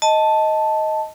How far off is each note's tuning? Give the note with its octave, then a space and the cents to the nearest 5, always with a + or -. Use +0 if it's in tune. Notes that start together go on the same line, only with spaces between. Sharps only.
D#5 +10 A5 +0